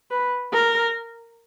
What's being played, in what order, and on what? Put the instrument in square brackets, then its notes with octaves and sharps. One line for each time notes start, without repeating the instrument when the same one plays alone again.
[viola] B4
A#4